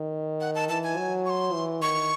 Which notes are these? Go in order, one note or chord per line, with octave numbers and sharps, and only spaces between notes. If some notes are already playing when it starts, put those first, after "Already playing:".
Already playing: D#3
F#5
A5
E3 A5
G#5
F#3
C#6
C6
E3
D#3 C#6